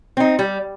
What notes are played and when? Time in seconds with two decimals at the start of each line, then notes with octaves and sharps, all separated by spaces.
0.17 C4 D#4
0.39 G3